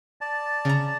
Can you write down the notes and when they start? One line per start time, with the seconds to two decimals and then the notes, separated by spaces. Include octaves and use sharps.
0.21 D5 A5
0.65 C#3 A#5